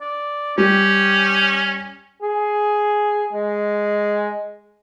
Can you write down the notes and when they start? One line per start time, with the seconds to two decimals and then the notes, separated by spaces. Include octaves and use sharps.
0.01 D5
0.58 G3 C#4 G4
2.22 G#4
3.33 G#3